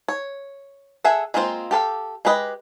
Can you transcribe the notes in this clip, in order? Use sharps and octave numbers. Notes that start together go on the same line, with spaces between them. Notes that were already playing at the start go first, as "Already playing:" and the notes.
C#5
G#4 A4 E5 F#5
G#3 A#3 C4 F4 C5
G4 A4 B4 F5
G#3 G4 B4 D#5